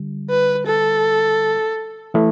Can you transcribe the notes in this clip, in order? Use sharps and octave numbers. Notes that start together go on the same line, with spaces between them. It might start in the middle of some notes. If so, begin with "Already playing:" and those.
Already playing: D3 G3
B4
A4
E3 A3 E4